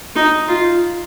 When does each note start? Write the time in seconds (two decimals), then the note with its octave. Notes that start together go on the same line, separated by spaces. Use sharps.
0.16 D#4
0.48 F4